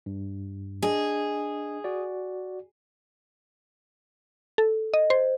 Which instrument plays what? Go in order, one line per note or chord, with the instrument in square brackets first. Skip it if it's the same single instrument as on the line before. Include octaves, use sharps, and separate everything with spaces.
[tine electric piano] G2
[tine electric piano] D4 D#5 [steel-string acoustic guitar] G#4
[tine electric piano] F#4 D5
[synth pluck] A4
D#5
C5